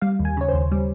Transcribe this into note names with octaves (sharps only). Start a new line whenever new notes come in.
G3 F5
D#2
G#5
C#3 C#5
C5
D#2
G3